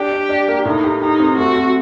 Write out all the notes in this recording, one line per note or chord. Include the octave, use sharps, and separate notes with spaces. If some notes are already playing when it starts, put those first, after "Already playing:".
Already playing: D4 G4
D4
D4
A#3
A2 D#4
G4
D#4 G4
C4
A3 F#4
C4